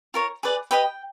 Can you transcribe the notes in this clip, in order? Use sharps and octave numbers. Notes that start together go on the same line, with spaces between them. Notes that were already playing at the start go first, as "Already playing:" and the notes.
F4 A#4 C#5
G#4 B4 D5
G4 B4 D#5 G5